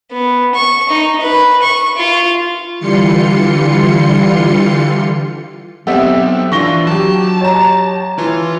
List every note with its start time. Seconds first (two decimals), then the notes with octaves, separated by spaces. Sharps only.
0.12 B3
0.55 C#6
0.90 D#4
1.21 B4
1.62 C#6
1.97 F4
2.79 D3 E3 G3 F4 C6 C#7
5.87 F#3 B3 C4 G4 A4 E5 F#5
6.52 E3 D4 F4 C#6 A#6 G7
6.87 F#3 G4 A5
7.41 C#5 A#5
8.18 E3 F4